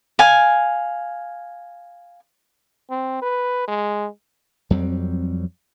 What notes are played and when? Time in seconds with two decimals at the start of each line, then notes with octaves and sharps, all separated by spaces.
0.19 F5 G#5
2.90 C4
3.22 B4
3.67 G#3
4.70 F2 F#3 G3 C4